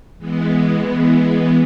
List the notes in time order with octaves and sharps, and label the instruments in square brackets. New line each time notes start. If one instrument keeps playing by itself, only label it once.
[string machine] E3 G#3 B3